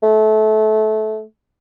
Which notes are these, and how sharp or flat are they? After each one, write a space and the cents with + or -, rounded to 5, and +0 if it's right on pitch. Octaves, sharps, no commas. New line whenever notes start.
A3 -25